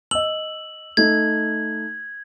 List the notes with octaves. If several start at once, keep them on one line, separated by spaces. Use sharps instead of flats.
D#5 E6 F#7
A3 D#4 G#6